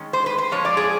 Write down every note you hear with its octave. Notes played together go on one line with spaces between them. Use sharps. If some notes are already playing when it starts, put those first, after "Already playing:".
Already playing: D#3 G#3 C#4
C5
B4
C5
A#2 F3 G#3 C4 C#5
D5
G#4